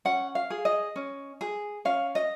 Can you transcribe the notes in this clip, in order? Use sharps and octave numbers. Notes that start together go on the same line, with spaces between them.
C#4 F#5
F5
G#4
D#5
C#4
G#4
C#4 F5
D#5